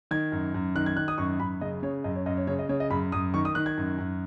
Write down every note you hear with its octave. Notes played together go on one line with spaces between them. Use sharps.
D#3 G#6
F#2
F#2
D#3 F#6
G#6
D#3 F#6
D#6
F#2 C#6
F#2 B5
C#3 D#5
C#3 C#5
F#2 D#5
C#5
F#2 D#5
C#5
C#3 C#5
D#5
C#3 C#5
D#5
F#2 B5
F#2 D#6
D#3 C#6
D#6
D#3 F#6
G#6
F#2
F#2